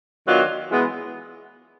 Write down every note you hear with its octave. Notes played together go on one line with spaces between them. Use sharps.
D#3 F#3 B3 D4 F4
E3 G#3 B3